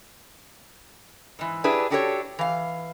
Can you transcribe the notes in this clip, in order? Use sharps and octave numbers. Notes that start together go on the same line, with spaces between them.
G#2 E3
D4 E4 G4 G#4 B4
D4 F#4 G4 A4 A#4 C#5
E3 F5